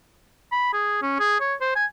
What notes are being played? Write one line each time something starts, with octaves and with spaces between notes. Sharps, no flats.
B5
G#4
C#4
G#4
C#5
C5
G#5